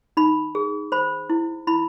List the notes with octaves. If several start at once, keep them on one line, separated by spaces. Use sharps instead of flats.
D#4 B5
G#4
C5 B5
E4
E4 B5